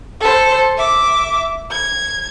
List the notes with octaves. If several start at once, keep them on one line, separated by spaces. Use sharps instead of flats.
A4 C5
E5 D6
G#6